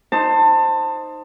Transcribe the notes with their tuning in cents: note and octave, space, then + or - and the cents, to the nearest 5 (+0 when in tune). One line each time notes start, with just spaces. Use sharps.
D#4 +0 C5 +5 A5 +25